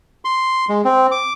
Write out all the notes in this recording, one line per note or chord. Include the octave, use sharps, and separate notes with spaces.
C6
G#3
C4
D6